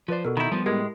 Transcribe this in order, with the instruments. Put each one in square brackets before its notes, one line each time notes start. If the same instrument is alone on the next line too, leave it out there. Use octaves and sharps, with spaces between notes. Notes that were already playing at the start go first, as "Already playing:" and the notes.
[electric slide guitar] F3 C5 [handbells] F4 B4 D5
[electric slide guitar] B2 [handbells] F#4 A4 A#4
[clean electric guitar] D#3 E4 [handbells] B5 G6
[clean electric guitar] F3 [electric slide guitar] G3 B3
[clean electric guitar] A2 G#3 [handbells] G4 A#4 G#6